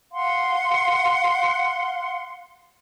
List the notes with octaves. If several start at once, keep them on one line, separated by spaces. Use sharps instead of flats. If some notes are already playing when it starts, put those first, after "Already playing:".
F5 F#5 C6